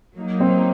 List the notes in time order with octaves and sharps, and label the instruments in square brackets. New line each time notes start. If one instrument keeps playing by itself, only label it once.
[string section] F#3 A#3 D#4
[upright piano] C4